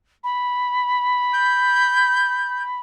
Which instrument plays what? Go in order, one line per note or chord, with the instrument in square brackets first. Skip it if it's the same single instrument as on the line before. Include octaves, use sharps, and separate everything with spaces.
[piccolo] B5
[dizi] G6